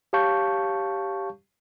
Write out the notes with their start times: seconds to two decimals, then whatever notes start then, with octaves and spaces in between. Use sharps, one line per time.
0.13 G4 C#5 F5 A5 C#6 G6